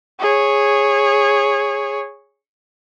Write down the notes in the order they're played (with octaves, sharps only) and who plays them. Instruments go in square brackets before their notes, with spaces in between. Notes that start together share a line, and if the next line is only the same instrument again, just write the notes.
[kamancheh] G#4 C#5